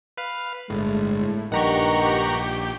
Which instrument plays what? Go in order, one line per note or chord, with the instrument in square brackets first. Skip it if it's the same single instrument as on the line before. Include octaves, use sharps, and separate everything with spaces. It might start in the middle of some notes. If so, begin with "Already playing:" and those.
[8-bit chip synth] B4 F5
[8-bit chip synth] G1 [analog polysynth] A2 [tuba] G#3
[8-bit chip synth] A#1 G4 G6 [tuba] G2 [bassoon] D#3 [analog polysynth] F#5 A#5 C#6